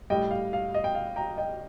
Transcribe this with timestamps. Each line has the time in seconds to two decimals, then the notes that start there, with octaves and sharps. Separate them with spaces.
0.10 A2 G3 D#5 G5
0.31 F5
0.53 F5
0.74 D#5
0.84 G5
0.95 F5
1.16 G5 A#5
1.37 D#5 G5